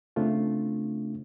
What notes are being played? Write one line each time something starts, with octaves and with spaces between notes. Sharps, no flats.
C#3 A3 C4 D4 F4